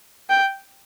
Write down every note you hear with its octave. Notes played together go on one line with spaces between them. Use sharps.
G5